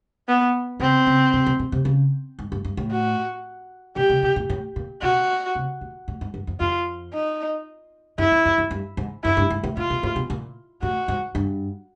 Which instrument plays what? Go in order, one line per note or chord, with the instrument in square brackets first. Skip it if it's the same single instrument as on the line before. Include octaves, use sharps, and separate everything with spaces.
[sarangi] B3
[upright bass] C#3 [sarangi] C4
[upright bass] C#3
C3
B2
B2
C3
C#3
G#2
G2
G2
A2
[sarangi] F#4
[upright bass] B2 [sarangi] G4
[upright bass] C3
B2
A#2
A2
A#2
[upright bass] B2 [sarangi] F#4
[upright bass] C3
A#2
A2
G#2
G2
F2
[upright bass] F2 [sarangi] F4
[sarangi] D#4
[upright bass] F#2 [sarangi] E4
[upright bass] F2
F2
F#2
G2
G#2
[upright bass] F#2 [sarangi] E4
[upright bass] G2
G#2
A2
[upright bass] A#2 [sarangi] F4
[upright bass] B2
A2
B2
A#2
[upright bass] A2 [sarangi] F#4
[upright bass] G#2
G2